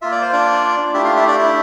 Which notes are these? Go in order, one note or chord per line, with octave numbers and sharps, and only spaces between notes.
A#3 F4 E5
D5
C5
D4 D5
A3 D4 E4 G4 E5
F4 F5
E4 E5
D4 D5
E4 E5